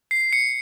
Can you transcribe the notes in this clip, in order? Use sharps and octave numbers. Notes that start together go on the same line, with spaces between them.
C7
C#7